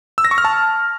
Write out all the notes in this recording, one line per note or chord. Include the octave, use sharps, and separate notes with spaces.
E6
A#6
C#6
F6
A5